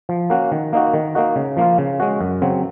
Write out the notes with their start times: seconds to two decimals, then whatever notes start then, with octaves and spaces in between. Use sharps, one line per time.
0.09 F3
0.30 A#3 C#4 F#4
0.52 D#3
0.73 A#3 D#4 F#4
0.94 D#3
1.15 A#3 D#4 F#4
1.36 C#3
1.57 F3 A#3 F4
1.78 C#3
2.00 G#3 C#4 F#4
2.21 F#2
2.42 C#3 F#3 C4